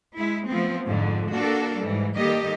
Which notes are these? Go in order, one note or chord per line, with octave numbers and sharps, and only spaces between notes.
G#3 E4
F3 A3 B3 C4
F2 G#2 D3
A#3 D4 F#4 A4
G#2 E3 G3
D#3 G3 A#3 G4 A4 D#5